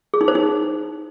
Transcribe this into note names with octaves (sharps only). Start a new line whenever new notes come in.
G#4
D#4
C5
D#4